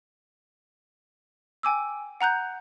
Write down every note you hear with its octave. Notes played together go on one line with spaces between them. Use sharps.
G5 G#5 D6 E6
F#5 A#5 F#6 G6